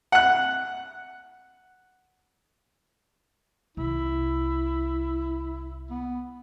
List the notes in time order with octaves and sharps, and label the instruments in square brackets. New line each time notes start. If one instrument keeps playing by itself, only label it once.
[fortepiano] F#5 F#6
[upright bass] C2 [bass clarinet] E4
[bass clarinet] B3